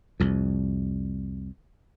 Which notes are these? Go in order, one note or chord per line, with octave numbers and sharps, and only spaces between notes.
C2 F2